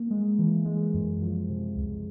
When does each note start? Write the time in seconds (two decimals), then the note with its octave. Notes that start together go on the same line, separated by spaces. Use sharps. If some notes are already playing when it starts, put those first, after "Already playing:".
Already playing: A#3
0.10 G#3
0.39 E3
0.65 G#3
0.94 F#2
1.22 F3
1.49 C3
1.76 C#2